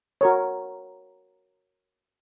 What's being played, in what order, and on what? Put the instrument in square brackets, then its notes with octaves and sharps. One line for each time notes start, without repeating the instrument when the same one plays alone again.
[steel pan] F#4 A#4 C#5